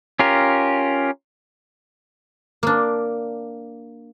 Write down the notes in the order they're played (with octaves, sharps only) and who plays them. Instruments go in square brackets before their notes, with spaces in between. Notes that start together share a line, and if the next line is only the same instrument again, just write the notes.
[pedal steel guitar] C#4 F4 G4 A#4
[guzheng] A#3 D4